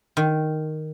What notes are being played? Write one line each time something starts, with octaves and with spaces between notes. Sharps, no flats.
D#3